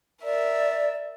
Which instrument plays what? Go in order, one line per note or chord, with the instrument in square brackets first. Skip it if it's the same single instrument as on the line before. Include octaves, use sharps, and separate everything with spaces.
[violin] A#4 E5 [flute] D5